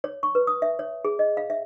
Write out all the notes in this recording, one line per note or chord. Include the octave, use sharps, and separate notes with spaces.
C#5
C#6
B4
D#6
E5
C#5
G#4
D#5
F5
E5